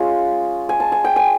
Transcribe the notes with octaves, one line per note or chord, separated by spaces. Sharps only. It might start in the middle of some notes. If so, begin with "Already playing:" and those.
Already playing: G#3 C#4 F4
G#5
A5
G#5
G5
G#5